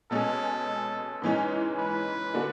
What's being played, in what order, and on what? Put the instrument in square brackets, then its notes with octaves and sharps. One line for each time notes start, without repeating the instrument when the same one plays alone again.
[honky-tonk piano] B2 G#3 C#4 G#4 [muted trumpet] A4
[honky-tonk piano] G#2 E3 G#3 C#4
[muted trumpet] B4
[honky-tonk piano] D3 A3 D4 F#4